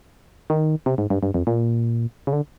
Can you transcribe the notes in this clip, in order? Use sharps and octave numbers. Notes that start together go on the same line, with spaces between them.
D#3
C3
G#2
G2
G2
F2
A#2
C#3
D3